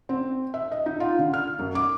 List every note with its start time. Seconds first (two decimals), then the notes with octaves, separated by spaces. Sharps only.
0.09 C4
0.54 E5
0.72 D#5
0.86 D#4
1.00 F4
1.19 D3
1.33 F6
1.59 F#2
1.75 D6